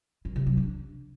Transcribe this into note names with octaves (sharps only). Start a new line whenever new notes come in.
D#3
C3
F#3
D4